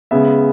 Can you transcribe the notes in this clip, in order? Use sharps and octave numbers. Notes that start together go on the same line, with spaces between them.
C#3 G#3 B3 E5